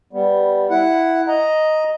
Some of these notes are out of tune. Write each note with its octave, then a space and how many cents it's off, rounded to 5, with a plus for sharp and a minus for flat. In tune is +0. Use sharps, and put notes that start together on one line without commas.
G3 +0 B3 +0
E4 +0 F#5 +0
D#5 +0 A#5 +0